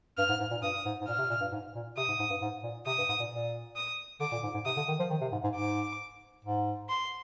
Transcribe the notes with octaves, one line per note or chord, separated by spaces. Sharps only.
G2 F6
G#2
G#2
A#2
G2 D#6
G#2
G#2
A#2 F6
C3
A#2
G2
G#2
A#2
C3 D#6
G#2
G#2
G2
G#2
A#2
C3 D#6
G2
G#2
A#2
A#2
D#6
D3 D6
A#2
G#2
G#2
C3 D#6
D3
D#3
F3
D#3
C3
G#2
G#2
G#2 D6
G#2
C6